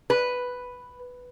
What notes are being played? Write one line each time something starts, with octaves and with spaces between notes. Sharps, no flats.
B4